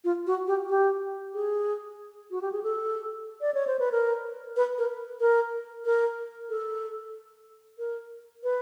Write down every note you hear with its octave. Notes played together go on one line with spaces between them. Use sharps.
F4
F#4
G4
G4
G#4
F#4
G4
G#4
A4
D5
C#5
C5
B4
A#4
B4
A#4
A#4
A#4
A4
A#4
B4